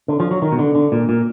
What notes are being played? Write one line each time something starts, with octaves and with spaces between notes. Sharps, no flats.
D3
F3
F#3
D#3
B2
D3
D3
A#2
A#2